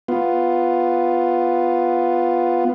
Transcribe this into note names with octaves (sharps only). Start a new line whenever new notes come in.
B3 F4